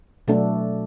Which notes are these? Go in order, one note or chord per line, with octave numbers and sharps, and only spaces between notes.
B2 F#3 A3 D4 A4